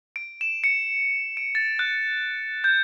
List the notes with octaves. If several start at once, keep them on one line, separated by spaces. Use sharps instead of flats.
D7
E7
C#7
D7
A6
F#6
G6